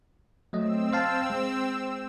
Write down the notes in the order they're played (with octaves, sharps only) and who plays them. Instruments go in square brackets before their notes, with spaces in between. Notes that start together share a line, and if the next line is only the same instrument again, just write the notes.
[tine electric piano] F#3 A3 D#5 [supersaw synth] C4 E6
[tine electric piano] C5 F5 A5
G#3